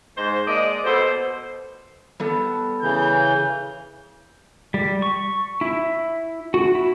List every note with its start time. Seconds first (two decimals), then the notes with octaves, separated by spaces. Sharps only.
0.17 G#2 C5
0.47 G#3 A#3 D5 D#5
0.84 B2 A4 C5
2.20 G3 B3 A4
2.82 C#3 E3 G6
4.74 G3
5.02 C#6
5.61 E4
6.54 F#4
6.75 E4